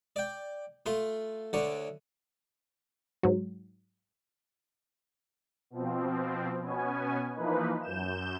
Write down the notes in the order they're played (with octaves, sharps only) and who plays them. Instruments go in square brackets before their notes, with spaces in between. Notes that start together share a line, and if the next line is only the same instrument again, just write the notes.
[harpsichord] D5 G5
A3 F4 C6
D2 D3 C#5 D5
[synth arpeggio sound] G#2 F#3
[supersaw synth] B2 F3 C4
B2 B3 C#4 G#5
E3 F3 A#3 D#4 B4
F#2 G6 E7